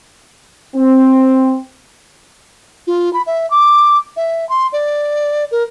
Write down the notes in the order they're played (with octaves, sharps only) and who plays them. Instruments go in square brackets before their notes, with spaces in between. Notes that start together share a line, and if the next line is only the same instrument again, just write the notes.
[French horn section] C4
[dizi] F4
B5
E5
D6
E5
C6
D5
A#4